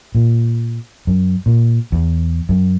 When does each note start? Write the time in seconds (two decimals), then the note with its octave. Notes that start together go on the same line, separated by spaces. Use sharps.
0.15 A#2
1.07 F#2
1.46 A#2
1.92 E2
2.49 F#2